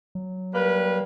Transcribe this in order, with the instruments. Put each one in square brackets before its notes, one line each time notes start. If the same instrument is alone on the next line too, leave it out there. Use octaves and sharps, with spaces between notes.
[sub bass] F#3
[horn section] G3 A#3 B4